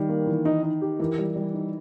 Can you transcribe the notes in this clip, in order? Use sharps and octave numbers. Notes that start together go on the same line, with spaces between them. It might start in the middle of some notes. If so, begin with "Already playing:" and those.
Already playing: D#3 G3
A#3
E3
D#4
D#4
G4
E3 A#4
G3
G3
D#4